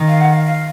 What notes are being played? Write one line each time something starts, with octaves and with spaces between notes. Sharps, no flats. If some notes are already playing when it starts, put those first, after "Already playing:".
Already playing: D#3
F5
F#5
F5
F5